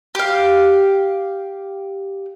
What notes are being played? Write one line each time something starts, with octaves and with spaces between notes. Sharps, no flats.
G4 F5